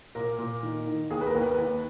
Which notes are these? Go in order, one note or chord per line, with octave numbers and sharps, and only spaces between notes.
A#2 A#4
A#2
D#3
D#3
D#2 G#4
B4
A#4
D#2
B4
D#2